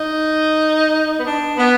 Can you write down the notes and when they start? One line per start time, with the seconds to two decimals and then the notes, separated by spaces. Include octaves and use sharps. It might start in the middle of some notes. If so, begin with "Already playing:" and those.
Already playing: D#4
1.20 B3
1.25 D4
1.58 B3